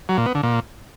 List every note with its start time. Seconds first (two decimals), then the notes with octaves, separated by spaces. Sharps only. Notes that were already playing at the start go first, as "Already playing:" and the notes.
0.09 F#3
0.18 A#2
0.26 B3
0.35 D3
0.43 A#2